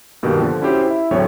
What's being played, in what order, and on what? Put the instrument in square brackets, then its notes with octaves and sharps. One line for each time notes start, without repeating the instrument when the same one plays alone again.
[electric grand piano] G2 B2 D#3 A#3 G4
D3 F3
C#4 E4 F#4 G4 C5
E4 E5
E2 A2 D3 F#3 C4 C#5